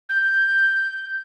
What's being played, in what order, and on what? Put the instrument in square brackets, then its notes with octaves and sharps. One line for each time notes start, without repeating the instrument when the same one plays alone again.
[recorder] G6